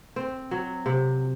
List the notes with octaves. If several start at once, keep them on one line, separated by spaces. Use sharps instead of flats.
C4
F#3
C3